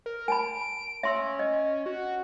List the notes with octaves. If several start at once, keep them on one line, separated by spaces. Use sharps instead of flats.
A#4
G#5 A5 B5 D7
C#4 E5 C6 E6
D#5
F#4